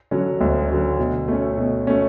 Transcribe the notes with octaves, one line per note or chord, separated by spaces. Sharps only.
D3 F#3 C#4
D2
D3 F#3 C#4
B2
A3 C#4
B2
A3 C#4